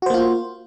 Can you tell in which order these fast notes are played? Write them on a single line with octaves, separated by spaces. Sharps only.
F#4 C5 A#3 F4